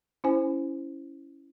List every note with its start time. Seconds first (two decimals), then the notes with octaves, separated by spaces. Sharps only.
0.24 C#4 E4 C5 G#5